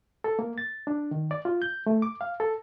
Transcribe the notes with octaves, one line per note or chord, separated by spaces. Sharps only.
A4
A#3
A6
D4
D#3
D5
F4
G6
A3
D6
F5
A4